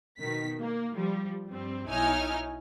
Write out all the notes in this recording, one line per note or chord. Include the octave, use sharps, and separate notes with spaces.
B2 D#3 B6
A#3
F3 G3
G2 G3 C4
B1 D#4 E4 C#5 G#5 F6